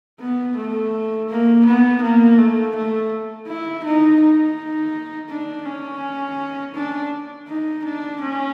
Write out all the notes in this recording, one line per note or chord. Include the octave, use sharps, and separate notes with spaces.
B3
A3
A#3
B3
A#3
A3
A3
E4
D#4
D#4
D4
C#4
D4
D#4
D4
C#4